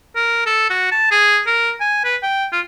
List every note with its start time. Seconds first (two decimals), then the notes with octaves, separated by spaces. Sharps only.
0.16 A#4
0.46 A4
0.70 F#4
0.92 A5
1.11 G#4
1.47 A#4
1.80 G#5
2.04 B4
2.23 G5
2.52 F4